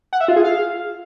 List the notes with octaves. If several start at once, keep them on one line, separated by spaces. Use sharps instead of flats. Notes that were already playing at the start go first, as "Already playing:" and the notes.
F#5
E5
F4
G#4
F5